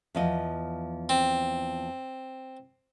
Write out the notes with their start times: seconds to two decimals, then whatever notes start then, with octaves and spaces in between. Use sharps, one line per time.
0.15 E2 F3 D#5
1.09 C4